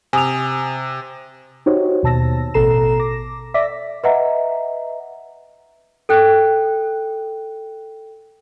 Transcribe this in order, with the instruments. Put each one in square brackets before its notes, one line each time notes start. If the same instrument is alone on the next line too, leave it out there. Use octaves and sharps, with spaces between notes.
[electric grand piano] C3 [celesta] G#5 D#6 F7
[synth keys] D#4 F#4 G4 C5 C#5
D#2 B2 A5 E6 A#6
A1 B2 A4 A#5 C7 E7
D6 A#6
D5 E5 D6 A#6 B6
[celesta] B4 D#5 E5 F#5 A#5
A4 G5 F#6